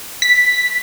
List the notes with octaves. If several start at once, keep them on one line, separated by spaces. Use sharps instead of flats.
B6